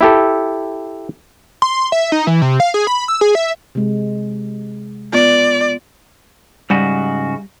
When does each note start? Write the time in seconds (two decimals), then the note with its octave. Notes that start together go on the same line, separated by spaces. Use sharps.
0.01 E4 G4 A4
1.62 C6
1.92 E5
2.12 D#4
2.27 E3
2.42 C3
2.60 F5
2.74 G#4
2.87 B5
3.08 E6
3.21 G#4
3.35 E5
3.75 C3 G#3
5.13 B3 F4 D5
6.70 G#2 C#3 G3 F#4